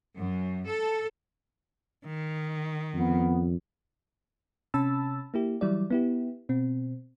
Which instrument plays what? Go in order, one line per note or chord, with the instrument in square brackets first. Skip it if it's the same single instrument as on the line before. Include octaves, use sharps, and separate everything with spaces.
[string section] F#2
A4
[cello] D#3
[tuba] F2 [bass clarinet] B3
[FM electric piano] C3 C#4 A5 B5 E6 A6
A#3 E4 G4
E3 F#3 G3 E4 D5
B3 E4 G4
B2 C4